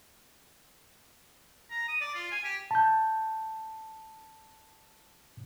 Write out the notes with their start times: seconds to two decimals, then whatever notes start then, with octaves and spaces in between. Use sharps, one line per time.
1.70 A#5
1.88 D#6
2.01 D5
2.15 F4
2.32 G#5
2.44 G4
2.71 A5 G6